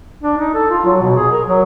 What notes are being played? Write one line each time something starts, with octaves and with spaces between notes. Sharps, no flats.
D4
D#4
A4
F4
F#3
B2
G#4
A#4
F#3